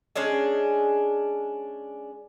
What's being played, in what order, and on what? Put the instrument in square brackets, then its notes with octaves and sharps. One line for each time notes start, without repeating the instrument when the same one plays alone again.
[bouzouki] G#3 C#4 D4 G#4